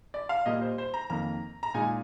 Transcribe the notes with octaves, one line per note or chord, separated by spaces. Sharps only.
D5
F5
A#2 G3 A#3 D#5
C5
C5
A#5
F2 D#3 A#3 A#5
A#5
A#2 G#3 D#4 G#5